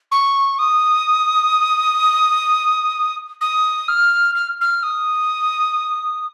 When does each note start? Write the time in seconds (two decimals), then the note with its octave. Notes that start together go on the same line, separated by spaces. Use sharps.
0.11 C#6
0.58 D#6
3.41 D#6
3.88 F6
4.35 F6
4.61 F6
4.83 D#6